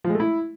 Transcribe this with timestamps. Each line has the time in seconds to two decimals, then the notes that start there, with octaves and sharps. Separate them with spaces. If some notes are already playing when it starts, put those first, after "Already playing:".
0.04 F3
0.10 G#3
0.15 A3
0.20 E4